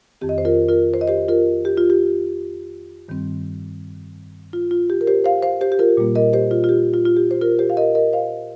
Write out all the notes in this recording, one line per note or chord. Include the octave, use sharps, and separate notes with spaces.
F2 D#3 C4 G4
D#5
C5
F4 A#4
F4 A#4
C5
D#5
G4 C5
F4 A#4
G4
F4
G4
G2 D#3 G3 C4
F4
F4
G4
A#4
G4 C5
C5 F5
C5 F5
G4 C5
G4
F4 A#4
A#2 G3 A#3
A#4 D#5
G4 C5
F4
F4
G4
F4
F4
G4
C5
F4 A#4
G4 C5
F5
A#4 D#5
A#4 D#5
C5 F5